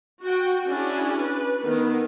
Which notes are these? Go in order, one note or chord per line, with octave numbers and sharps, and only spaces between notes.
F#4 G5
C#4 D4 E4 F#4 G#4
B4
D#3 A3 B3